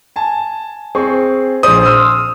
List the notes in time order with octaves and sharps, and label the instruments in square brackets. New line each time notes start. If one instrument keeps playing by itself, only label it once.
[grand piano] G#5 A5
C4 G#4 C#6
[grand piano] A#1 G#4 C5 [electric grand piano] D#6
[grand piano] C6 E6 F6